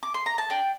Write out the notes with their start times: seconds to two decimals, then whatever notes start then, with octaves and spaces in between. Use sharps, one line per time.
0.03 D6
0.14 C6
0.26 A#5
0.38 A5
0.50 D4 G5